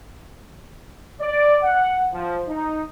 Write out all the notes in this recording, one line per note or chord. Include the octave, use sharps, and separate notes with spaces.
D5
F#5
F3
D#4